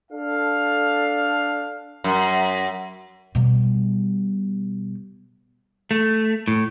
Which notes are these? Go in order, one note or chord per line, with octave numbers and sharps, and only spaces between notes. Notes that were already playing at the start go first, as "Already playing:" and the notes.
D4 A4 F5
F#2
B2 G3
A3
A2